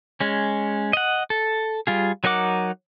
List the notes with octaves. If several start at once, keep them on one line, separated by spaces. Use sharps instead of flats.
G#3 C#4
D#5 F#5
A4
G3 F4 G#4
F#3 D#4 A#4 F#5 D6